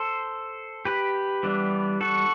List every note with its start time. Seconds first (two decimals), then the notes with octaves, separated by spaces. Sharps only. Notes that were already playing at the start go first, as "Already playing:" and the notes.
Already playing: A4 C5
0.85 G4 B4
1.43 E3 G3 B3 D4
2.01 F#4 A4